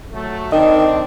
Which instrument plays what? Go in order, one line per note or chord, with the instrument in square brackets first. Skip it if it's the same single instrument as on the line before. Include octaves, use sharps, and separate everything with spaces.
[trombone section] F#3 A3
[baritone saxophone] D#3 [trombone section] C4 D4 [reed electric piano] D#5 [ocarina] G5